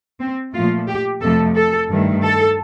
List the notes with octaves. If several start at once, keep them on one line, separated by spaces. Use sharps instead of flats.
C4
A#2 F3 A3 F4
G4
F2 C3 F3 A3 A4
A4
G2 D#3 A3
A4